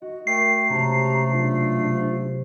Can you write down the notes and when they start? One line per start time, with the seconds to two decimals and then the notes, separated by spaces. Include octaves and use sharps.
0.02 F#4 D#5
0.27 A3 A#4 G5 C7
0.69 C3 G#3 C#4 G4 A5 A#5
1.31 B1 D4 F4
1.76 C3